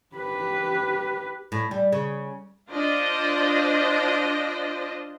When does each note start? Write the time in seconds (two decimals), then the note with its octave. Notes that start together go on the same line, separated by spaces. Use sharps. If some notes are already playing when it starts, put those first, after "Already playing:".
0.16 G4 B4
1.52 A2
1.71 G3
1.92 C#3
2.71 D4 F4 C5 D#5